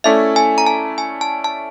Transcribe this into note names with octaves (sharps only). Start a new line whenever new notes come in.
A3 C#4 E4 A4 D5 E5
G#5
A#5
A5
G#5
A5
A5